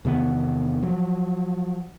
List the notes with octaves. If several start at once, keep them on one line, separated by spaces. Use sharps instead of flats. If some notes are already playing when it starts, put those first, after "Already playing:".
E2 C3 D#3 B3
F3 F#3